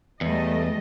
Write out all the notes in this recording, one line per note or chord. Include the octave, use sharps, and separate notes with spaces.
E2 G3 A3 D#5